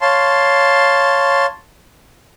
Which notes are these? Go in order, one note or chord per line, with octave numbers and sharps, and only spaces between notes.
C#5 F5 A5 C6